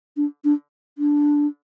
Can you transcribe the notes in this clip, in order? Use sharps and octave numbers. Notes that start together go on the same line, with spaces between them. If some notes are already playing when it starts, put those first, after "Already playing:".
D4
D4
D4